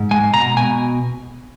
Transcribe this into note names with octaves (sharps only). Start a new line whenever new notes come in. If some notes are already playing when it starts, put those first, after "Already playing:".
Already playing: G#2
G#3 G#5
B2 A#5
B2 G#5